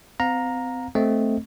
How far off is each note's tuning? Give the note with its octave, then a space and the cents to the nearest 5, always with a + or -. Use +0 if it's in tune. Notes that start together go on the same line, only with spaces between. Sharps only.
C4 -35 F5 +30 A#5 +0
A3 +0 C4 +0 D#5 +0